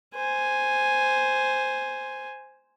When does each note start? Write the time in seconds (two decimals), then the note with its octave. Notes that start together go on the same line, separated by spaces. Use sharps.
0.15 C5 G#5